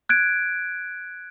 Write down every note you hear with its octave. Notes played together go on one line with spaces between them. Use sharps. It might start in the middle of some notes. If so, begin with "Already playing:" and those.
F#6 G#6 D7